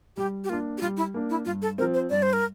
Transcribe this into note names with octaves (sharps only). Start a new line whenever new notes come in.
G3 G4
G4
A#3 D4 F4
G4
G3 F4
E4
A#3 D4
E4
G2 F4
A4
F3 C4 A#4
C5
G2 D5
C5
A#4